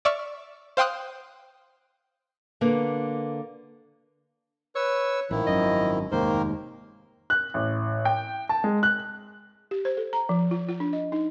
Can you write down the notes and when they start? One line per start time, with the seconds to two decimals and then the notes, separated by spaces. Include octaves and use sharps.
0.05 D5 E5 C#6 F6
0.77 C5 F5 G5 C6 D#6 F#6
2.61 D3 A#3 A#4 B4
4.75 B4 C#5 E6
5.31 A1 D#3 F3 E4
5.47 G#1 F#2 D#5
6.12 F1 D#2 G#2 D#3 A#3 A#4 C5
7.30 F#6
7.54 A1
8.05 G5
8.49 A5
8.64 G#3
8.83 F#6
9.71 G4
9.85 C5
9.97 A4
10.13 A#5
10.29 F3
10.51 F4
10.69 F4
10.80 D4
10.93 D#5
11.12 D#4